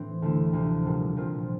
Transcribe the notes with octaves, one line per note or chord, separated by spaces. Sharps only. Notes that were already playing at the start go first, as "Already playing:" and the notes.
Already playing: A2 E3 C4 D4 E4
D2 D3 A3 E4
D2 C3 F3
C2 A#2 G3 D4
A#2 F3 C4 F4